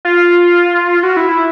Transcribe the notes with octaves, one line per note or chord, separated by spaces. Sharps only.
F4
F#4
E4
E4